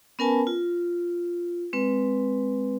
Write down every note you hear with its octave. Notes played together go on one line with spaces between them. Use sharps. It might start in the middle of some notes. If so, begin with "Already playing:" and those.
B3 C#4 A#4 B4 G#5 A5
F4
G#3 C4 B4